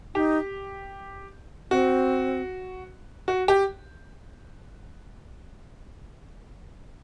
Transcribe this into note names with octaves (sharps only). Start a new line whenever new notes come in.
D#4 G4
C4 F#4
F#4
G4